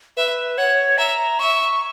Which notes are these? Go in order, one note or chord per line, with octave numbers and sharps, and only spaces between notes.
B4 E5
C#5 F#5
E5 A#5
E5 C#6